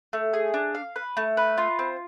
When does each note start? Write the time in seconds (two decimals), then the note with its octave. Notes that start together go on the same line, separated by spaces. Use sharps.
0.13 A3
0.33 G#4
0.54 D4
0.75 F5
0.96 B4
1.17 A3
1.37 B4
1.58 F4
1.79 C4